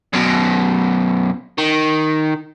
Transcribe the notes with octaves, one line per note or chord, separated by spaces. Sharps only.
F#2 B2
D#3